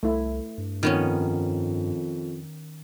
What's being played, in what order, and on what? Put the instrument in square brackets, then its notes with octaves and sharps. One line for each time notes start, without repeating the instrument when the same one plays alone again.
[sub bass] C2 [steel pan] A3 E4
[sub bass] G2
[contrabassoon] F2 [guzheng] D#3 B3 C#4